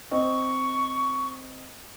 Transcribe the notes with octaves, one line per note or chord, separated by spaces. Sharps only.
C4 D#5 C#6